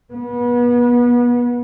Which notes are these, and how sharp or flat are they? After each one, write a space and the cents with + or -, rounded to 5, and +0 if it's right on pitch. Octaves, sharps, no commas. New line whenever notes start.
B3 -30